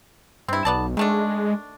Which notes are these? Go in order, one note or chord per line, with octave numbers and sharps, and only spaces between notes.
G2 C4 E4
B1 B3 D5 A5
D#3 G#3 A3 D4